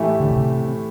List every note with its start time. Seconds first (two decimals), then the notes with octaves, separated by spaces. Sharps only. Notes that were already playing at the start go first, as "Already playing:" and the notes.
Already playing: A2 E3 A3 E4 G4
0.20 D3
0.31 C3